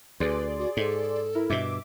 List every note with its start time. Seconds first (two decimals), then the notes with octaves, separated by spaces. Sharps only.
0.20 D2 G#4 B4 D5 C6
0.58 F#4
0.77 G#2 A4
1.35 E4 A#4
1.50 G2 B2 E5 D6